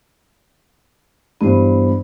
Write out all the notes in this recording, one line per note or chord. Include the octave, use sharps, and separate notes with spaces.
G2 E3 B3 C5